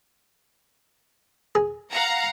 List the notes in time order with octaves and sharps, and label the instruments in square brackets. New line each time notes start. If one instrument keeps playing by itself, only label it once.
[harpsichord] G#4
[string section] F5 F#5 A#5